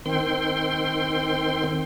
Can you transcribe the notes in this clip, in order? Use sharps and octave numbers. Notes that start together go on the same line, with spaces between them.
D#3 C4 G5 C6